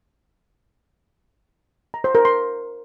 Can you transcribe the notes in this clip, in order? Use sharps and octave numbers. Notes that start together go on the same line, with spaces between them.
A#5
C5
A#4
C6